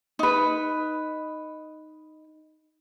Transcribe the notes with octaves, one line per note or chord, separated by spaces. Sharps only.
D#4 B4